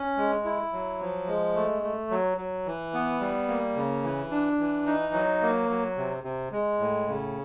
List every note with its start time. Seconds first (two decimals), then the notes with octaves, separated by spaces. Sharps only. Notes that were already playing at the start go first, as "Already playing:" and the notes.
Already playing: C#4
0.17 G#3
0.45 E4
0.73 F#3
1.01 F3
1.28 G#3
1.55 A3
1.83 A3
2.11 F#3
2.38 F#3
2.66 E3
2.94 B3
3.21 G3
3.48 A#3
3.76 C#3
4.03 E3
4.31 D4
4.59 E3
4.86 D#4
5.13 F#3
5.42 A#3
5.69 F#3
5.97 C3
6.24 C3
6.52 G#3
6.79 A2
7.07 C#3